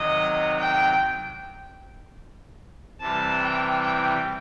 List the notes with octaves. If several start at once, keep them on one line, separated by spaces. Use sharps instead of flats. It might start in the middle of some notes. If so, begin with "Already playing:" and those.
Already playing: C3 D#3 F#3 D#5
G5
C3 E3 G3 A5
G5
G5